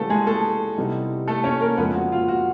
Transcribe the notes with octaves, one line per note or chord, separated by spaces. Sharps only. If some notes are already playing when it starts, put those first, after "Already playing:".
Already playing: C#3 E3 G3 A3 B3 A4
G#3 G#4
A3 A4
C3 E3 G3 B3 D#4
A3 A4
C#4 C#5
A#3 A#4
F2 C#3 F3 G#3 B3 C4 B4
F#4
F4
F#4